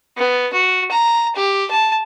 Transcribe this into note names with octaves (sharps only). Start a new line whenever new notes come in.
B3
F#4
A#5
G4
A5